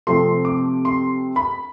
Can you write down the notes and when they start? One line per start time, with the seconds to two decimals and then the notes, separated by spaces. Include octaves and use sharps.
0.07 C3 F3 A3 C4 C6
0.45 D6
0.85 C6
1.36 B5